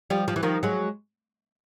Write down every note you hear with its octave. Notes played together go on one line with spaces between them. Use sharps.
F3 G3
F3
E3
D#3 F3
F#3 G#3